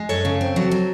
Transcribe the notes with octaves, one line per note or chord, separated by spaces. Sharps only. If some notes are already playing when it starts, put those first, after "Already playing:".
Already playing: G#3
F#2 A4 C#5
C#3
C4
F#3
F#3